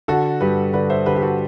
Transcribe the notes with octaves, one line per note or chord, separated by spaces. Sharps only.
D3 F#4 A4
G2 G4 B4
D3 B4 D5
C5 E5
D3 G4 B4
G4
F#4 A4